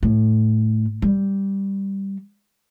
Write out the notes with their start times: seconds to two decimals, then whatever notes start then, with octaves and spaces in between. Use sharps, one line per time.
0.03 A2
1.02 G3